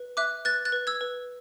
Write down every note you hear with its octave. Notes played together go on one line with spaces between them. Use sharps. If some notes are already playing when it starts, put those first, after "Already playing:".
Already playing: B4
E5 D6 F#6
B4 F#6 A6
F#6 A6
B4
E6 G#6
B4